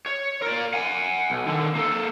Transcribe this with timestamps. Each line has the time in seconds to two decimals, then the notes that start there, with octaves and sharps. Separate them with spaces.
0.06 C#5
0.42 A#4 D5
0.74 F#5 G#5
1.30 B1
1.47 D3 D#3
1.75 A#3 A4